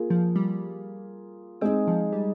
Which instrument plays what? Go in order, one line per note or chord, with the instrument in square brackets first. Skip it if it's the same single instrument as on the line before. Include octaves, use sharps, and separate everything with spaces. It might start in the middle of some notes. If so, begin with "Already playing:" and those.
Already playing: [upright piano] A#3 F4 G#4
[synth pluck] F3
G3
[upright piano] G#3 D#4 G#4 [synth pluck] C4
[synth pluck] F3
G3